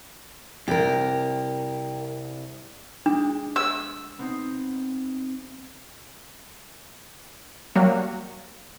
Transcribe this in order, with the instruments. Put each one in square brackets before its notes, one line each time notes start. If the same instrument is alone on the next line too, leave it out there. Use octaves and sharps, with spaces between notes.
[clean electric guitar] C2 [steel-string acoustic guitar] G4 A#4
[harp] G#3 D6 [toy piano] D4
[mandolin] E6
[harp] B3 C4 D#4
[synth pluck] F#3 G3 A#3